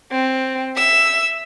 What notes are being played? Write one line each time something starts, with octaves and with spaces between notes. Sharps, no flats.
C4
E5 E6